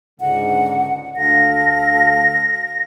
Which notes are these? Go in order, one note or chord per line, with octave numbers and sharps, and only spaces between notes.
C#2 G#2 D3 F#5
D2 A4 F5 A#6